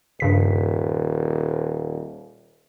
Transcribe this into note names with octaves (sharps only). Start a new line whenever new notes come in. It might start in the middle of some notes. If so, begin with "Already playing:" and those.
D#1 G2 C#3 B6